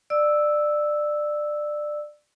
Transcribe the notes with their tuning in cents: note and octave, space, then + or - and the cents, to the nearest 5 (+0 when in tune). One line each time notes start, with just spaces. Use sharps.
D5 +20 E6 -5